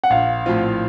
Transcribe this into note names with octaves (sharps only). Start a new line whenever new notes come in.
F#5
A#1 F5
A2 F3 C4 F4